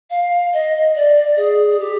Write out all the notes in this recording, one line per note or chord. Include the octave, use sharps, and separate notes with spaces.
F5
D#5
D5
G#4
G#4
G4